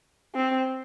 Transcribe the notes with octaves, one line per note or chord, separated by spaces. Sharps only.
C4